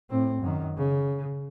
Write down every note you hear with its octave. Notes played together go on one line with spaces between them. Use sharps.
A2 C4
F#2 D#3
C#3